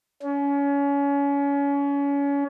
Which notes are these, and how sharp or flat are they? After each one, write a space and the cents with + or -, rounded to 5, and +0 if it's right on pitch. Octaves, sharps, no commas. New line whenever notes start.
C#4 +30